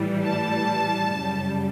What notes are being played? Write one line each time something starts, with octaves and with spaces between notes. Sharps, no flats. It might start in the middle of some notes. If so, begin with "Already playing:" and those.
Already playing: A2 E3 G3
A5
F#2 C#3 G3